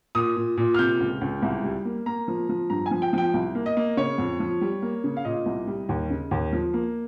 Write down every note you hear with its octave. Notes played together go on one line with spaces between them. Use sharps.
A#2 D#6
A#2
A#2
F6
C3 G6
C#2
C#2
C2
G3
A#3
A#3 A#5
F3
F3
G2 A#5
G#5
F3
G5
F3 G5
C2
A#3
D#5
A#3
C#3 C#5
F2
F3
G3
A#3
C#3
F5
A#2 D#5
C2
G3
D#2
C#3
D#2
F3
A#3